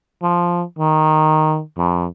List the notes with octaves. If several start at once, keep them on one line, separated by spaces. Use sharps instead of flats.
F3
D#3
F2